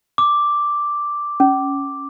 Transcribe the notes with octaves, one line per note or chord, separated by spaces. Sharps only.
D6
C#4